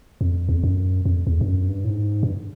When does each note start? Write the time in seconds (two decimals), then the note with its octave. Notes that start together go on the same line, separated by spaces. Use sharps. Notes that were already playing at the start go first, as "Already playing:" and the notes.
0.21 F2
0.49 E2
0.56 F2
0.63 F#2
1.05 F2
1.27 E2
1.41 G2
1.48 F#2
1.68 G2
1.85 A2
1.90 G#2
2.23 G2